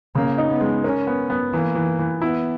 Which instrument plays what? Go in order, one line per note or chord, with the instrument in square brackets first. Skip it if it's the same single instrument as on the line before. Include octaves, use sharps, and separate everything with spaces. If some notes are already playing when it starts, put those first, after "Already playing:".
[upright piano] C#3 [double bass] A#3
[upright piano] D#4
[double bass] B3
[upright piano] G#3
[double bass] C#4 [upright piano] A#4
[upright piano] B3
B3
[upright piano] E3 [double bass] A#3
[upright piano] E3
E3
[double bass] B3 [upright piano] E4